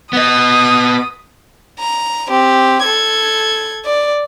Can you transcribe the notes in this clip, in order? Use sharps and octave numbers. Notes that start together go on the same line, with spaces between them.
B3 D#5 D#6
A#5
C4 G4
A4 G#6
D5